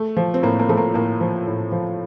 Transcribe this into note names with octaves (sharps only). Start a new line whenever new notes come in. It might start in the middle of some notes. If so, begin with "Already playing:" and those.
Already playing: A3
F3
C4
A2 A#3
A#3
F3 A3
A#3
A2 A#3
F3
A2
F3